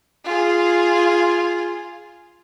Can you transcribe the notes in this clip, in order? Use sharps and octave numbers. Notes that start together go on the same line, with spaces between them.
F4 G#4